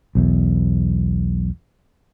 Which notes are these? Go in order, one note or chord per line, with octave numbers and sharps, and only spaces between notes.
B1 E2